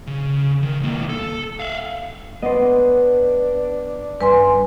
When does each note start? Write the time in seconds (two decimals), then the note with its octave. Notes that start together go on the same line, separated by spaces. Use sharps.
0.07 C#3
0.62 D#3
0.80 C2 A#3
1.09 A4
1.60 E5 F5
2.42 B3 D4 C5 D5 D#5
4.21 G2 B4 G#5 C6